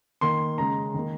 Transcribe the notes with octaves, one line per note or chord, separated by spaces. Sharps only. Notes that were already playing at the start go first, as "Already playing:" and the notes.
D#3 A#3 C6
C#3 G#3 A#5
D#3 A#3